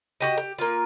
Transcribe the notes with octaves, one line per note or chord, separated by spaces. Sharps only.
F#4 G4 D#5
G4
A#3 F4